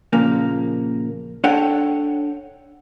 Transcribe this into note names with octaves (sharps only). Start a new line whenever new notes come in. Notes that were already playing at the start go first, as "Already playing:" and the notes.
A#2 C#3 F3 A#3
D4 A4 C#5 F#5 G5 A5